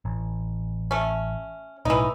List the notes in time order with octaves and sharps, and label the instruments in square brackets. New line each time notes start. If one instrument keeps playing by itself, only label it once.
[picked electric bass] A1
[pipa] A3 C#4
[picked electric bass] B1 A2 [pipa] E3 D#4